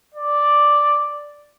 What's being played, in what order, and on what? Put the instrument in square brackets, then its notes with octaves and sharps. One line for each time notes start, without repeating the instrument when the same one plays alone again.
[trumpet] D5